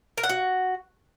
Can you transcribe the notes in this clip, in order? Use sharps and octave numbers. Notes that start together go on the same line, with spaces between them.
A#4
F#5
F#4